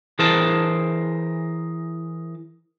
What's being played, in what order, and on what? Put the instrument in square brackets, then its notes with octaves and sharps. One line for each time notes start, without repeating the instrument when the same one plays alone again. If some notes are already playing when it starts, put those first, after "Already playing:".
[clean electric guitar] E3 G#4 A#4 C5 A5